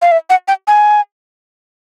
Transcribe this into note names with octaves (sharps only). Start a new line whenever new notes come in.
F5
E5
F#5
G5
G#5